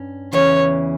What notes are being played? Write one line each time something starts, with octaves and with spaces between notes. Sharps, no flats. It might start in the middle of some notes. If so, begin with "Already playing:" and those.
Already playing: G2 C#4
E2 C#3 E3 C#5